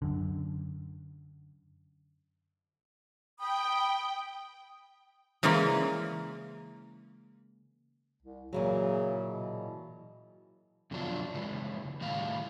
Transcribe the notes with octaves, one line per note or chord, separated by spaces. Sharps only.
F#2 D3
G5 B5 D#6
C#3 E3 G#3 A#3 C#4 D5
C2
A#2 C#3 E3 F#3
B2
F2 B2 D3 F#3 D4 F4
C#3 E3 G#3
A2 D#3 G3 E4 F5